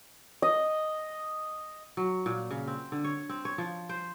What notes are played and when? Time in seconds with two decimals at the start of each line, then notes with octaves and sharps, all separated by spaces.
0.42 D#5
1.97 F#3
2.26 A#2
2.51 C#3
2.67 C4
2.92 D3
3.04 C#5
3.29 C4
3.45 C#5
3.58 F3
3.89 C5